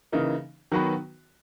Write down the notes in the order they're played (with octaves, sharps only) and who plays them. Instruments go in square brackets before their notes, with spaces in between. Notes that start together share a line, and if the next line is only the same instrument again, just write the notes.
[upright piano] C#3 E3 A#3 D#4
D#3 F#3 B3 F#4 B4